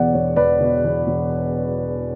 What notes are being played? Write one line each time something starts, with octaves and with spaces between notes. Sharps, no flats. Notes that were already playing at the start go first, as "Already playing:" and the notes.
Already playing: E2 B2 D5 F#5
E1 C#5
E1 B4 D5
B2
E2
E1